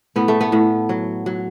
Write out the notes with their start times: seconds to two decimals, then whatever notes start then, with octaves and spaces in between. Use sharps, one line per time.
0.16 A2 B3
0.28 A3
0.41 B3
0.52 A2
0.89 F#3
1.26 F#3